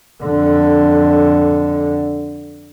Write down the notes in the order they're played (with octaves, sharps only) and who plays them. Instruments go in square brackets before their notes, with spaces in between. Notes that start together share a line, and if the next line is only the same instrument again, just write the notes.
[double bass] F2 D3